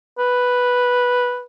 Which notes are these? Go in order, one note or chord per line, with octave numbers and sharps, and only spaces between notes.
B4